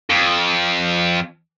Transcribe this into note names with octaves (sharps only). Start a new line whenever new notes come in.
F2